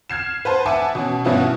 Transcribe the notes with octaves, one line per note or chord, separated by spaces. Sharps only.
F6 G#6 C7 E7
B4 C5 A5
E5 F#5 G#5 A5 D6
B2 C#4
G2 B2 B3 C#4 E4 F4